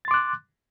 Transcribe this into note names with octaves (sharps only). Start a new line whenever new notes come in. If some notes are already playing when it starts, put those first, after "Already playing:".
C6 D6 F#6 A6